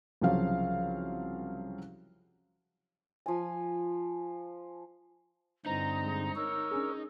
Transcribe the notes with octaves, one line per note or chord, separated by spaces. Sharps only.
C2 C#3 F3 F#3 F5
F3 G#5
G2 D3 C4 D#4 E4 B4 A#5
G#3
A#4 C#5 E6
C#4 D4 G#4